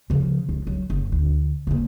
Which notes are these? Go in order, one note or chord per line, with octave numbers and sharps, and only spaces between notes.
C#3 F3
C#2
F#3
F#1
D2
C#3 A#3